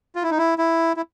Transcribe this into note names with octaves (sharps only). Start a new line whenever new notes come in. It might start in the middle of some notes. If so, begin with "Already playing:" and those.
F4
E4
D#4
E4
E4
E4